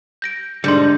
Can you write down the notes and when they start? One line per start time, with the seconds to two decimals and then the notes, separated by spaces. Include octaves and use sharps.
0.22 G6 A#6 D7
0.64 G#2 D3 G3 D#4 C6 G6 C#7